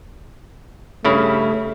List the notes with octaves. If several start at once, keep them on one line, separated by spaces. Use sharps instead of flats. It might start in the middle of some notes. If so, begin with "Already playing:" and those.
G2 C#3 A3 E4